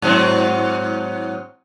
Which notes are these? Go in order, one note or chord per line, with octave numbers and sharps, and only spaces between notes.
G#2 F#3 C4